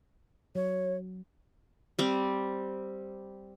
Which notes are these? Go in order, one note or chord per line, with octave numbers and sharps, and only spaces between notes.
F#3 C#5
G3 C4